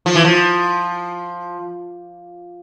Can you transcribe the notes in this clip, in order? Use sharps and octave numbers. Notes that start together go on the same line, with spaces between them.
F3
E3
F3